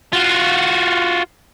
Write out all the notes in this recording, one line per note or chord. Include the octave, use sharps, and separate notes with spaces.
F4 F#4